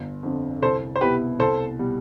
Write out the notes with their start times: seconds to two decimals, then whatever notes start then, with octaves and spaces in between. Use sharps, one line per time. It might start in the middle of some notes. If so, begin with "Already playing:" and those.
Already playing: G1
0.23 F2 D3
0.62 C2 A4 C5
0.96 C5
1.01 B2 B3 E4 G4 B4
1.39 C2 A4 C5
1.79 B2 G3